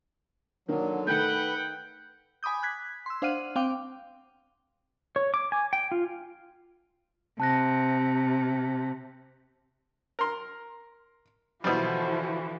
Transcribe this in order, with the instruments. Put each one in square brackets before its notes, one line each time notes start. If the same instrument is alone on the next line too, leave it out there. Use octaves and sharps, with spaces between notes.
[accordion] D3 F#3 [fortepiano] D#3 A#3
[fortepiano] D#3 A3 [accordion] B4 [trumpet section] F#5 G5 [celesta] G6
[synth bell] G#5 B5 D6 D#6 G6
F#6 G#6 B6
C6 E6
D4 C5 F5 F#5 F6 D#7
C4 F5 G5 D6
[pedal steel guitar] C#5
D6
G#5
G5
F4
[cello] C3 [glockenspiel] A5 F#6 A#6
[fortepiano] A#4 C6
[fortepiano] B2 G3 [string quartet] D3 E3 F3 [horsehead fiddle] E4 F#4 [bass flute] C5